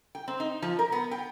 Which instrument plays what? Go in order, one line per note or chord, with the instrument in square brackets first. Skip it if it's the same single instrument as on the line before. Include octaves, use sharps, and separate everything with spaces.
[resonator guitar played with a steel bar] G5
C4
D#4
F3
A#4
B3
G5